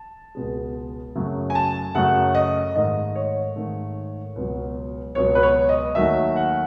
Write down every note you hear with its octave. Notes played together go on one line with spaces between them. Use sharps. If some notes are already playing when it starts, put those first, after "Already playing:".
Already playing: A5
C#2 B2 G#3
F#2 C#3 F#3 A3
G#5
A5
F#2 C#3 F#3 A3 F#5
D#5
G#2 D#3 A3 D#5
C#5
G#2 D#3 A3
C#2 B2 F#3
C#2 B2 F#3 C#5
B4
C#5
D#5
D#2 D#3 F#3 A3 E5
F#5